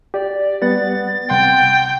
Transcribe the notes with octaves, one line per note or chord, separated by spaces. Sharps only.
G4 D5
G3 B3 F#5 A6
C2 F#5 G5 C6